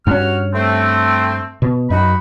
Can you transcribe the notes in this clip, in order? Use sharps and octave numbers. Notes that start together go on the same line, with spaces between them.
G2 C#4 F#4 F6
A3 C4
B2
F#2 D#4 F#4 B5